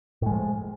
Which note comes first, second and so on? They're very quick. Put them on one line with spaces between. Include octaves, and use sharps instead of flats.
A2 G#3 F3